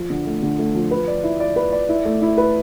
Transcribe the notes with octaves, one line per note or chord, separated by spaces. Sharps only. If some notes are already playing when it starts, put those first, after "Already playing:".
Already playing: F3
D3
A3
D3
A3
F3
B4
D5
E4
D5
B4
D5
E4
A3
E4
B4